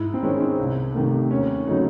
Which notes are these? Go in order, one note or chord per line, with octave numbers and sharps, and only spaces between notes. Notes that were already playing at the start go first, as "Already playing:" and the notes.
Already playing: G#2 E4
C4
D#3 G#3 C#4
C4
C2
C3 D#3 A3
D#2 C#4
C#3 F#3 A3 D#4